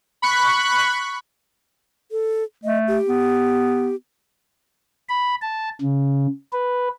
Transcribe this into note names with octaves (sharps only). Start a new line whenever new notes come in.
B5 C#6 F#6
A4
A3 D#5
G4
B3
B5
A5
C#3
B4